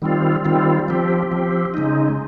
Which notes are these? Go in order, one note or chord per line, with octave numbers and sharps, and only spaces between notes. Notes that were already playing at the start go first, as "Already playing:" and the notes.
D#3 G3 C4 F4
D#3 G3 C4 F4
F3 C4 G4
F3 C4 G4
C#3 G#3 D#4